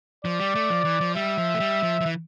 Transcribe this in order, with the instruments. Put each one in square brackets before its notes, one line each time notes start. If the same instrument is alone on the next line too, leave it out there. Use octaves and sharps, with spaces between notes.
[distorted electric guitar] F3 [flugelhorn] D5
[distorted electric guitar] G3
A3
F3
E3
F3
[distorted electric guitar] G3 [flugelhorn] E5
[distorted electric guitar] F3
A3
G3
F3
F3
E3